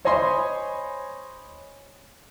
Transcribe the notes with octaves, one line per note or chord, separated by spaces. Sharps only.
C5 C#5 D#5 G#5 B5 C6